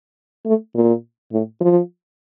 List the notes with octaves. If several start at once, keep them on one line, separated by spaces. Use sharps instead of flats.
A3
A#2
A2
F3